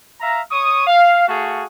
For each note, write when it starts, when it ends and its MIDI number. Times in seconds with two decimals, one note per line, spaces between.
0.20 0.41 76
0.20 0.41 77
0.20 0.41 82
0.51 0.84 73
0.51 0.84 85
0.51 0.84 87
0.87 1.24 77
1.28 1.63 57
1.28 1.63 66
1.28 1.63 68
1.28 1.63 69
1.28 1.63 77